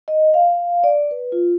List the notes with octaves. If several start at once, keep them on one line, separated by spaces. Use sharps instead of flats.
D#5
F5
D5
B4
F4